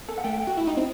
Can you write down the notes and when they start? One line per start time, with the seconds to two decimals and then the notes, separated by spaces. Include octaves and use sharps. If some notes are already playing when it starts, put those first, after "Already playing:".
0.08 A4
0.18 F#5
0.24 A3 G5
0.40 G5
0.47 F#4
0.57 E4
0.67 D#4
0.77 C4